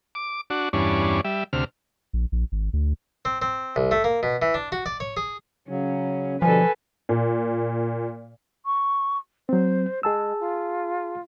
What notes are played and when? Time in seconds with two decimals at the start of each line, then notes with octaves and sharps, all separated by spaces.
0.15 D6
0.50 D4 F#4
0.73 E2 G2 C#4 D4
1.24 G3 E5
1.53 D2 C3 F6
2.13 A#1
2.32 A#1
2.52 G#1
2.73 D2
3.25 C4
3.42 C4
3.76 C2
3.91 A3
4.04 A#3
4.23 B2
4.42 E3
4.54 D4
4.72 F#4
4.86 D5
5.00 C#5
5.17 G#4
5.69 C#3 F#3 C#4
6.42 B2 D3 F3 G3 A4 B4 G#5
7.09 A#2
8.65 C#6
9.49 F#3 C4 C5
10.03 G#3 G#4 A5 E6
10.40 F4